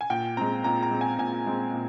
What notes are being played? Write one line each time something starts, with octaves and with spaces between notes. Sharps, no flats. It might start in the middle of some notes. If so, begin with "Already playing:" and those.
G#5
A#2 G5
G#3 C4 A#5
A#2 A#5
A#5
G#3 C4
G#5
A#2 G#5
G#3 C4
A#2